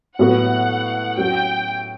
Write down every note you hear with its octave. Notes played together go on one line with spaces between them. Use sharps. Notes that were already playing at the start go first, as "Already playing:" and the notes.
A2 F#3 B3 F#4 B4 F#5
F#3 C#4 F#4 G5